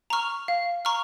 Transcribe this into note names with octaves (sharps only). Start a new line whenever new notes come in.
A#5 C#6 F6
F5
A#5 C#6 F6